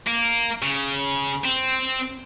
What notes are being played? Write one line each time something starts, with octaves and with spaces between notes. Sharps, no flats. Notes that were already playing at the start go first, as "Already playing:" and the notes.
A#3
C#3
C4